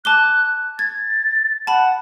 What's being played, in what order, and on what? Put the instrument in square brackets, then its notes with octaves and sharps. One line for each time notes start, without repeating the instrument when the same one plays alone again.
[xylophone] A5 D6 G7 [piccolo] F#6
[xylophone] G#6 [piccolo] A6
[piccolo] F#5 [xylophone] A5 B5